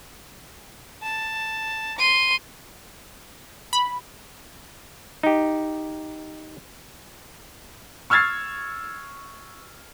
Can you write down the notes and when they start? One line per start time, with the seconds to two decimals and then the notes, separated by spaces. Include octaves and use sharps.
1.03 A5
1.99 C6 D#7
3.73 B5
5.23 D#4 G4
8.10 C#6 E6 F6 G#6 A6 C7